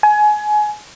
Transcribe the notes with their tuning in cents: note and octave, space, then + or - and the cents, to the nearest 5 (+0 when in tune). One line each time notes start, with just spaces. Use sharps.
G#5 +25